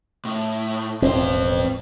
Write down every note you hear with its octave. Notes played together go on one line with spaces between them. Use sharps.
A2
E1 A1 F2 C4 C5